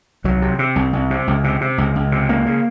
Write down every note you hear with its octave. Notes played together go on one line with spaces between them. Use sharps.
C2 F#3
C3
C3
C2
C2
C3
C#2
C3
C3
C#2
C#2
C3
C#2 A#3
C#3